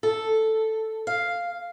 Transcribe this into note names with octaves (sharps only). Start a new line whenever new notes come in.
A4
F5